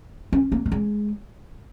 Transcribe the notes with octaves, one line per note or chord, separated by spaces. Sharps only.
C#4
A#3
A#3
G#3